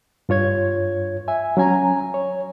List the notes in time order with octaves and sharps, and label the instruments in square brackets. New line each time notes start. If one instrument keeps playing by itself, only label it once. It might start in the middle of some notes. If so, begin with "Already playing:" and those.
[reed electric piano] G2 F4 C#5 G#6
E5 G#5
F#3 C#4 G#5 A#5
C#5